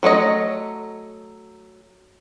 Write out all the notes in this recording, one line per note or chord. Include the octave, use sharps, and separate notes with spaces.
F#3 A3 C#5 D#5